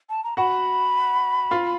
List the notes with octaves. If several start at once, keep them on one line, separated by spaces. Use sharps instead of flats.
A5
A#5
F#4 F#5 B5
F4 F5